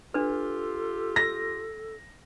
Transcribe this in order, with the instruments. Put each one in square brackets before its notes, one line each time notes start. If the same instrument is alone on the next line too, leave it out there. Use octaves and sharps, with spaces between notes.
[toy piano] D4 B4 [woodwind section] F4 G4 [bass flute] A4
[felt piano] A#6